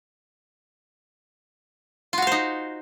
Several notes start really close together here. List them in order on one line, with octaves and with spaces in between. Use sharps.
F4 F#4 F5 C5 D#4